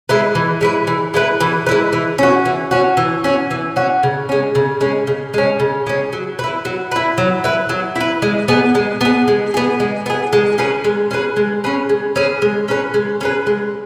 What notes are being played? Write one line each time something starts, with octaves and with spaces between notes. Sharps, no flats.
G#3 E4 B4
E3
G#3 E4 B4
E3
G#3 E4 B4
E3
G#3 E4 B4
E3
C#4 F#4
E3
C#4 F#4
E3
C#4 F#4
E3
C#4 F#4
C#3
G#3 C#4
C#3
G#3 C#4
C#3
G#3 C#4
C#3
G#3 C#4
F#3
E4 B4
F#3
E4 B4
F#3
E4 B4
F#3
E4
B4
G#3
B3 G#4
G#3
B3 G#4
G#3
B3 G#4
G#3
B3 G#4
G#3
C#4 G#4 B4
G#3
C#4 G#4 B4
G#3
C#4 G#4 B4
G#3
C#4 G#4 B4
G#3
C#4 G#4 B4
G#3
C#4 G#4 B4
G#3